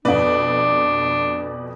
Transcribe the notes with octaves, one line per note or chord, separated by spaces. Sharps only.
F2 B2 D4 B4 D5